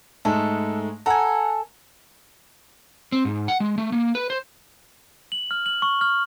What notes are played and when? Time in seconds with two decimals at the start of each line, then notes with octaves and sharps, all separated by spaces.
0.25 G#2 G#3 A3 A4
1.06 A4 F#5 G#5 A#5
3.12 C4
3.25 G#2
3.48 F#5
3.60 G#3
3.78 A3
3.92 A#3
4.15 B4
4.30 C5
5.32 F#7
5.51 F6
5.66 F#7
5.82 C#6
6.01 F6